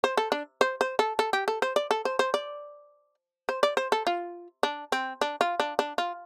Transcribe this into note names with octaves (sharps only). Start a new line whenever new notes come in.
C5
A4
D4
C5
C5
A4
A4
G4
A4
C5
D5
A4
C5
C5
D5
C5
D5
C5
A4
F4
D4
C4
D4
F4
D4
D4
F4